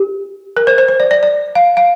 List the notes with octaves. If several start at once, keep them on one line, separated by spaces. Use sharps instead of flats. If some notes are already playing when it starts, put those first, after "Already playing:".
Already playing: G4
A#4
C5
C5
C5
D5
D5
D5
F5
F5